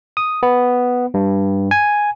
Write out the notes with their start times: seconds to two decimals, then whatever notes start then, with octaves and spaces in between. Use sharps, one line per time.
0.17 D#6
0.43 B3
1.14 G2
1.71 G#5